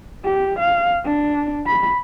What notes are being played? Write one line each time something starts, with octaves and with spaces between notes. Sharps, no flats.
G4
F5
D4
B5